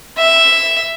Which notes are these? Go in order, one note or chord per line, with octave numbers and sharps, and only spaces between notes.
E5